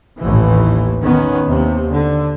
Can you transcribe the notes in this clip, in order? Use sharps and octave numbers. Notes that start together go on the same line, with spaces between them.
A1 D#2 E3
D#3 B3 C#4
D#2 C3
D3